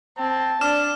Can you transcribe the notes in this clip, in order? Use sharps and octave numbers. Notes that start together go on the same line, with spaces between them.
C4 A5
D4 D6 F6 E7